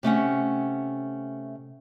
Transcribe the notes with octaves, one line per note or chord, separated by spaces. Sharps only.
C3 A3 C#4 F#5